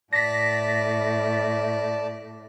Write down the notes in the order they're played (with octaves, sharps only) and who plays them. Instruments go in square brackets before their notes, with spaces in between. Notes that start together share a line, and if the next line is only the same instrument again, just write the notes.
[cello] A2 [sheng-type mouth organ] D5 A5 [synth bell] A#6 B6